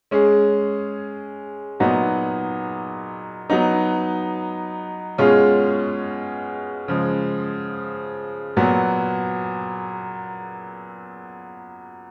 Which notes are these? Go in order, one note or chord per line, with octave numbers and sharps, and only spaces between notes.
G#3 C#4 G#4
A#2 F#3 B3 D#4 F#4
F#3 B3 D#4
B2 G#3 C#4 F4 G#4
C#3 F3 G#3
A#2 F#3 B3